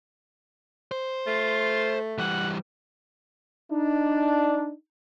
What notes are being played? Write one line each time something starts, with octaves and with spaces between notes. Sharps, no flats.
C5
A3 F4
E3 G3 F#5
D4 D#4